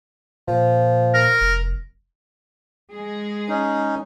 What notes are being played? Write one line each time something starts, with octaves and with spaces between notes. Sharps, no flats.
A#2 F3
A#4
F1
G#3 G#4
C#4 D#4